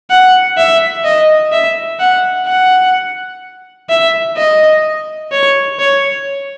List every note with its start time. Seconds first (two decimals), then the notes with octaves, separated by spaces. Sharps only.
0.10 F#5
0.57 E5
1.04 D#5
1.52 E5
2.00 F#5
2.47 F#5
3.89 E5
4.37 D#5
5.32 C#5
5.79 C#5